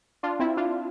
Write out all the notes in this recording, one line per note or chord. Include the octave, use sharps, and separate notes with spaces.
D4 F4
C4 E4
D4 F4